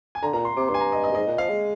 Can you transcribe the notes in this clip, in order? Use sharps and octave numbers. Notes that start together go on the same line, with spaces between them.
G#5
D3 A#5
A#2 A#5
C6
C3 D6
G2 C6
G#5
A#5
D#5
D#5
G2
G#2 D#5
A#2
F3 F5
G#3